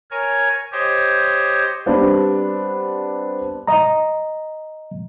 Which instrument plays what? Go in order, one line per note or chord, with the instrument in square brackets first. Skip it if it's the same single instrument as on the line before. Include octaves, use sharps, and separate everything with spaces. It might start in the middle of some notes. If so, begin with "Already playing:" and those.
[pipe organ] A#4 C#5 G#5
G4 C5 C#5 D#5
[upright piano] G3 B3 C4 D4 G4
[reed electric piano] D#5 A#5